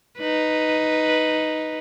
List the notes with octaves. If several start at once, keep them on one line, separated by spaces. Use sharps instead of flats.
D#4 B4